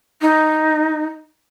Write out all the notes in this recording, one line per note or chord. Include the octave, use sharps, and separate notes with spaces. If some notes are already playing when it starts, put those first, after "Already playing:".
D#4